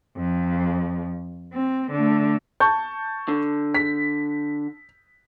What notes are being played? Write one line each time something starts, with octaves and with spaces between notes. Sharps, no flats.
F2
C4
D3 A3
A5 C#6 G6
D3
B6